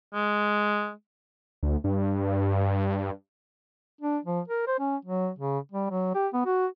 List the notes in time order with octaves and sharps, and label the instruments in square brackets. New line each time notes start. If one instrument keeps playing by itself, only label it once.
[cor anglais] G#3
[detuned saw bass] D2
G2
[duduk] D4
F3
A#4
C5
C#4
F#3
C#3
G3
F#3
G4
B3
F#4